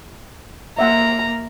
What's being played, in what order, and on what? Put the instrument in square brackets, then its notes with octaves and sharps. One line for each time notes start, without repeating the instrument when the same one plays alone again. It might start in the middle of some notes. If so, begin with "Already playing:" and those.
[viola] A#3 [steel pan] E5 F#5 C6 [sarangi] A#5